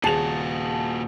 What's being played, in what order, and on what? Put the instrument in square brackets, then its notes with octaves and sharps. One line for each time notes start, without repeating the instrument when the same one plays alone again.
[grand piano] D#1 G#4 F7 [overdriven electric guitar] A#2 F#4 [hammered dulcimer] A5